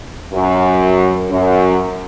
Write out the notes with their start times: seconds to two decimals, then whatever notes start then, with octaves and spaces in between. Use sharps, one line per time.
0.33 F#2
1.30 F#2